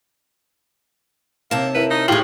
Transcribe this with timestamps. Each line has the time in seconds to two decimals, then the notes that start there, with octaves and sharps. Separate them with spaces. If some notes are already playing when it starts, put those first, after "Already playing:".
1.51 D#2 C3 A#3 A5
1.75 E4 A#4 B4 E5
1.91 D#4
2.08 A2 D#3 F4 G4 G#4 F#7